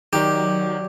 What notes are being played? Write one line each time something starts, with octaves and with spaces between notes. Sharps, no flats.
D#3 F#3 D#4 G4 D5 D6